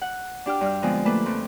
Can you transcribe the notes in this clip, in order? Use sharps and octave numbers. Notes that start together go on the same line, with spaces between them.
F#5
D4 G4 G5 F6
G2 D4 F6
D3 F3 G#3 B3 C4
A3 A#3 D4 A4 B4
F2 A3 C4